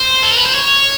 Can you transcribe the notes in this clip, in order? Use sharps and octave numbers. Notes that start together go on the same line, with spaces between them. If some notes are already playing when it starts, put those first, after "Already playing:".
Already playing: C5
A4
A#4
B4
C5
C#5